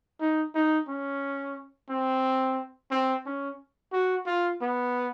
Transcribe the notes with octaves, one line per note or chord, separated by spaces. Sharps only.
D#4
D#4
C#4
C4
C4
C#4
F#4
F4
B3